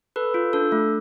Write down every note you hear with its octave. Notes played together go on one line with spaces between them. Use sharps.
A4 B4
F4
D4 A4
A3